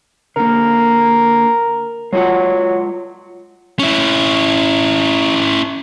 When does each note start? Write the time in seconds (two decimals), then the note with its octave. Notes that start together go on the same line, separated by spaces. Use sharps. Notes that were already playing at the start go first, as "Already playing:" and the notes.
0.36 D3 A#3 A#4
2.13 F#3 G#3 F4 F#5
3.79 C#4 E4